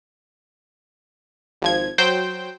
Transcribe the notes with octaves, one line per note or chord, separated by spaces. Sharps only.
G#1 F3 G#6
F#3 C5 G5 G6